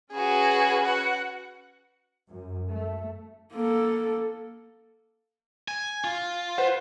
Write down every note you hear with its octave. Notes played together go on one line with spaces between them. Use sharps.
C#4 F#4 G#4 B4
F#5
F#2
A3
A#3 A4
G#5
F4
B4 C5 F#5